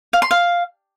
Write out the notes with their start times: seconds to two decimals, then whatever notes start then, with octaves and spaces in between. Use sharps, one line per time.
0.13 F5
0.22 C6
0.31 F5